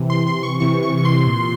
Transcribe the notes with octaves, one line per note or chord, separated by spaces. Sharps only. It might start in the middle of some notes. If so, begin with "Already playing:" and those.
Already playing: C3 E3
C6
C6
C#6
C3 E3 C#6
C#6
C#6
C6
A#2